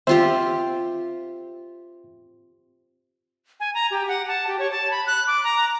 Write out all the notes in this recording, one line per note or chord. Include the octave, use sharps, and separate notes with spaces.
C4 F4 G4 C5 E5
G#5
A#5
G4
F#5
A5
G4
C#5
A5
B5
F#6
D6
A#5